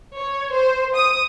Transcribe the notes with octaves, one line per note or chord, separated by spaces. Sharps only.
C#5
C5
D#6